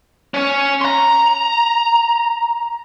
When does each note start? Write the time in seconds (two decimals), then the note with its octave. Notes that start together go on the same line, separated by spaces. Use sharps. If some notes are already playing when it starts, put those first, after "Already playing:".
0.34 C#4 C#5
0.81 A#5 C6